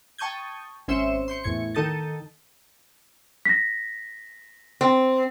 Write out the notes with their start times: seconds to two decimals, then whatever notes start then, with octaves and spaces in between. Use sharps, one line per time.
0.18 G5 A5 C#6 D#6 G6 G#6
0.88 G#1 C#4 C5 E5 C#7 E7
1.28 C6 G6 C#7
1.43 E2 A2 G#6 C#7
1.75 D#3 D#4 A4 D#6 G6 A6
3.45 A#6 B6
4.81 C4